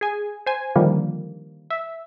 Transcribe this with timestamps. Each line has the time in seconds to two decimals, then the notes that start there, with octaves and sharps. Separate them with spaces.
0.01 G#4 G#5
0.46 C5 G#5
0.76 D3 D#3 F3 G3 A#3
1.70 E5